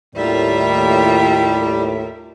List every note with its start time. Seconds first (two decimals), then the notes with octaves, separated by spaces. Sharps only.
0.15 D#2 A2 G3 F4 A#4 E5